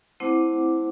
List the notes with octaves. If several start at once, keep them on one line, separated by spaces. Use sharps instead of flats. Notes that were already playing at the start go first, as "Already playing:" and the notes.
A3 C4 E4 C5 F#5 D6